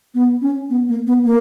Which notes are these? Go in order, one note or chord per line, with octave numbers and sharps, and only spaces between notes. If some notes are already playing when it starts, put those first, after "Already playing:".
B3
C#4
B3
A#3
B3
A#3